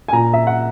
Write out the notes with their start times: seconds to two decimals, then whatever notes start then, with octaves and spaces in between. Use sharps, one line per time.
0.08 G#5
0.13 A#2 A#5
0.33 E5
0.47 F#5